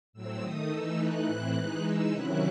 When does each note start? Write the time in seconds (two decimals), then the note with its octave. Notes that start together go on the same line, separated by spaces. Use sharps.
0.13 A2 F#3 C4 E6
0.41 D#3 A3 D#4 D#6
0.69 E3 A3 D#4 E6
0.97 E3 A3 D#4 F#6
1.25 A2 E3 C4 E4
1.54 E3 G#3 D#4 F#6
1.82 E3 G#3 D#4 E6
2.10 C3 D#3 F#3 C#4 E4 F#6